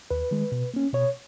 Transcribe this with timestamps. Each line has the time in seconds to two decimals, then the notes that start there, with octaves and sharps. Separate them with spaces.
0.11 D#2 B4
0.31 D#3 G#3
0.52 B2
0.74 A#3 C#4
0.93 B2 C#5